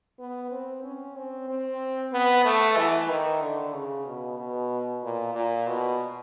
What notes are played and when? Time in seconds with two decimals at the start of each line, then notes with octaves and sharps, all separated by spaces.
0.19 B3
0.51 C4
0.84 C#4
1.16 C4
1.49 C4
2.13 B3
2.45 A3
2.77 E3
3.09 D#3
3.41 D3
3.74 C#3
4.06 B2
4.39 B2
5.03 A#2
5.35 A#2
5.67 B2